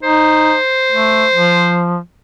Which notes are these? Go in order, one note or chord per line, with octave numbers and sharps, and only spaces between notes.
D#4 C5
A3
F3